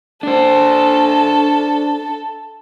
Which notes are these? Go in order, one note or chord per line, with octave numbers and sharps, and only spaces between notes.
D4 A4 C5